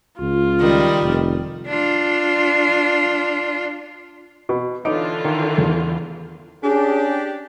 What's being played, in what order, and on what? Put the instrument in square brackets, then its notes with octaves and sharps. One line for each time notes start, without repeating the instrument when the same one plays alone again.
[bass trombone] C#2 [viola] F4
[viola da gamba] D#3 G3
[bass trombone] F1
[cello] D4 F4
[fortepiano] B2
[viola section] D3 E3 F4 [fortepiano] D#4 [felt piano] C#5 D6 D7
[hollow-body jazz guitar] D#3
[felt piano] E2
[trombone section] C#4 G#4 [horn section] D4 G4